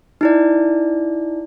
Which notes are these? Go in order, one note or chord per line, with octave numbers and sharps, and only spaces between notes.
D#4 E4 D5